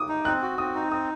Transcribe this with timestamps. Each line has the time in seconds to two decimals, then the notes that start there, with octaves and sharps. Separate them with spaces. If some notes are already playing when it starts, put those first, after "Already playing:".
Already playing: D6 D#6
0.09 D#4
0.25 C4 F#6
0.42 F#4
0.58 C4 D#6
0.75 D#4
0.92 C4 D#6